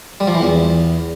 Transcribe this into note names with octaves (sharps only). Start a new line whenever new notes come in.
G3
F3
E3
E2